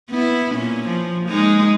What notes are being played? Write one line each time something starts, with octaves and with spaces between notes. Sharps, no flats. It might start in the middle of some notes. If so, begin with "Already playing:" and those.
B3 E4
A#2 C#4
F3
G#3 A#3 D#4